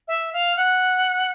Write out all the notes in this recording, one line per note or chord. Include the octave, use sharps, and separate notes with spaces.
E5
F5
F#5